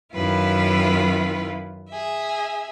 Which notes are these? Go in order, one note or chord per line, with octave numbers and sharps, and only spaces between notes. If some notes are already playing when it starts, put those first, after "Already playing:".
F#2 D#3 E4 F4 B4 F5
G#4 E5